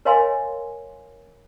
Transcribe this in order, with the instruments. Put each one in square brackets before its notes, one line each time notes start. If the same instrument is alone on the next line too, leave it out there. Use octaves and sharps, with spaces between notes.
[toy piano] A#4 C#5 D#5 F5 G#5 C6